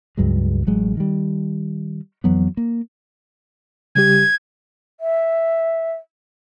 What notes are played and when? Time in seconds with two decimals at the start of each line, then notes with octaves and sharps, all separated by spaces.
0.17 C#2 G2 F#3 G#3
0.67 A1 F#3 G#3
0.97 D#3 G3
2.24 F2 E3 F#3 B3
2.57 A#3
3.95 C#3 G3 G4 G#6
5.00 E5